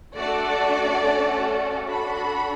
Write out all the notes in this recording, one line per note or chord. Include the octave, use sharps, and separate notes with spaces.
A3 D4 F#4 A4 D5
A3 C#4 F#4 A4
D4 F#4 A4 B5